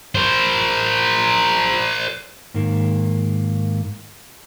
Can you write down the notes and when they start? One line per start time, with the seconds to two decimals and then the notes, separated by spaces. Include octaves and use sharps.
0.15 A#4 C5
2.54 G#2 D#3 A#3